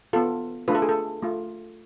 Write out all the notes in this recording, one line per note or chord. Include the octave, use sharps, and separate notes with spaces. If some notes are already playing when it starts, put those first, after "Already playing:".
B3 F4 A4
A3 D4 F4 B4
A4
G#4
A4
A3 F4